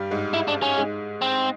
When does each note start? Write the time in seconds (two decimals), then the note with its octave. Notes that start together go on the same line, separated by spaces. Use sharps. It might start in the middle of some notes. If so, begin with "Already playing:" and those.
Already playing: G2 G3
0.11 G#2 G#3
0.34 E4
0.48 D4
0.63 C#4
0.77 G#2 G#3
1.22 C4